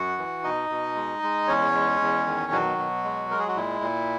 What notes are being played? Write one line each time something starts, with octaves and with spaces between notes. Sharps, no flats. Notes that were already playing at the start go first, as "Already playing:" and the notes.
Already playing: F#2 F#4 F#5
E3
B2 D#4 D#5
B2
G#3
G#3
E2 C#4 C#5
G#3
E2
D#3
B2 F#3 F#4
B2
G#3
G#3 A#4
G#4
F#4
A#2 E4
A#2